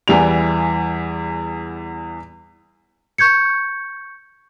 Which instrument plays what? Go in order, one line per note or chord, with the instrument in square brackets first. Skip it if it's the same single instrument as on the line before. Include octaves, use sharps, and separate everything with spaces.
[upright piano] E2 E3 G3 F7
[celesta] C#6 G6 G#6 C#7